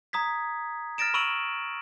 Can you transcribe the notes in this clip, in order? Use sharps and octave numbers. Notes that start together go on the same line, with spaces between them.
A#5 D#6 G#6 B6
F6 A6 A#6 D7 E7
B5 C#6 E6 D7 D#7 F#7